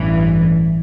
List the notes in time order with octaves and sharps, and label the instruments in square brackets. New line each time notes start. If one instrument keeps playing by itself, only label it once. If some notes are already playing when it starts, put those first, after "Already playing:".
Already playing: [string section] A1 G2 E3